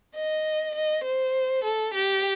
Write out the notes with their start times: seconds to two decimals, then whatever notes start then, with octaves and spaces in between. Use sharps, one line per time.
0.15 D#5
0.75 D#5
1.04 C5
1.64 A4
1.94 G4